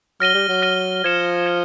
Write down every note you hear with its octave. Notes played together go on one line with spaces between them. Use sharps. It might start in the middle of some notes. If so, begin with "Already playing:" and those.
F#3 F6 A#6 D#7 G7
G3
F#3
F6 A#6 D#7 G7
F3 G#6 C#7 E7 G7
G#6 C#7 E7 G7